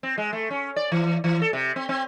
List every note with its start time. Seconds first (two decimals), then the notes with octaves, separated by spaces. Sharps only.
0.03 C4
0.18 G#3
0.33 A3
0.51 C#4
0.76 D5
0.92 E3
1.24 E3
1.42 A4
1.53 C3
1.76 C4
1.89 C4